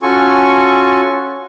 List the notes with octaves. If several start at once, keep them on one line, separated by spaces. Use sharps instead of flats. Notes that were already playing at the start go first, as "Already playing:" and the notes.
C#4 F4 F#4 A4 G#5 C#6